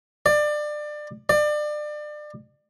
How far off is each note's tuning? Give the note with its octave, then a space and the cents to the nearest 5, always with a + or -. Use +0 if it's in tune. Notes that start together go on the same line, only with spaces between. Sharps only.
D5 +25
D5 +30